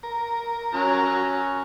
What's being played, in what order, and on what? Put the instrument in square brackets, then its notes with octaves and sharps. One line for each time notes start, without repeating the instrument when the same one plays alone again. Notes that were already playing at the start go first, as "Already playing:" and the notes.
[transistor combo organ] A#4
[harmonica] F#3 A#5 [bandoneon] C#4